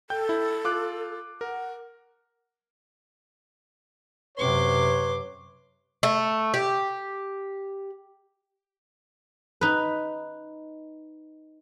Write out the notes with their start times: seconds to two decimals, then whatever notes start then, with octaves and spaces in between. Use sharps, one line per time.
0.10 A4 G5 G6
0.29 E4
0.65 F4 D6 F#6
1.41 A#4 F#5
4.38 F#2 C3 B4 C#5 C6 D6
6.03 A3
6.54 G4
9.61 D#4 B4